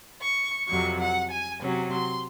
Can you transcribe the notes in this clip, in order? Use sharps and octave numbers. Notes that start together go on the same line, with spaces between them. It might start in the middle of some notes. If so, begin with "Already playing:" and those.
C#6
F2 C3 F#3 C#6
F#5
G#5
C3 F#3 C#4
C6